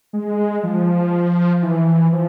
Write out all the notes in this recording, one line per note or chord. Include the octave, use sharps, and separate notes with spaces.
G#3
F3
E3
F3